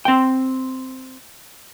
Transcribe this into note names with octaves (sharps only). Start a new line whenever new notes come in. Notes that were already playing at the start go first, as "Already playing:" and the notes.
C4 G5